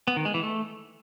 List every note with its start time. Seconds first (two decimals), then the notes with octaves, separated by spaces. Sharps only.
0.08 B3
0.16 D#3
0.25 G#3
0.34 E3
0.43 A3